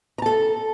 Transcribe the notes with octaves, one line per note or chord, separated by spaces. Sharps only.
A4 A5 A#5